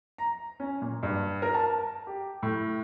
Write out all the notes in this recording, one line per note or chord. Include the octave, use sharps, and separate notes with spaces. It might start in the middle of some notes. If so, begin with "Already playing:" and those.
A#5
C#4
A#2
G2
A#4
A5
G4
A2